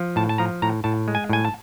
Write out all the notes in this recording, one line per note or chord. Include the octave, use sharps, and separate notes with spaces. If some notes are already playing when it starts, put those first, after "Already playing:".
Already playing: F3
A2 A5
A5
F3 A#5
A2 A#5
A2 A5
G#3
G#5
A2 G#5
A5